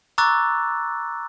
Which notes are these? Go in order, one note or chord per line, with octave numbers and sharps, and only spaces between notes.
A#5 C#6 D6 E6 F#6 A6